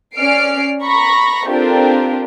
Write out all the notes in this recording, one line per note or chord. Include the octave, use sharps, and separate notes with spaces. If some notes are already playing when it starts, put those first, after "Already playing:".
C#4 D5 F6 C7 D7
A#5 B5 C#6 A#6
C4 D4 F4 G4 A4 A#4